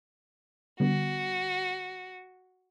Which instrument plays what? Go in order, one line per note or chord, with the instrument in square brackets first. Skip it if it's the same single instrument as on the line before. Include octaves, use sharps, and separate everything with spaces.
[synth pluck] D3 G3 B3 [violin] F#4